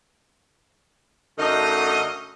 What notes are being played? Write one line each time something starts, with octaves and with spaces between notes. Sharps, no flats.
F#2 D3 A3 D#4 D#5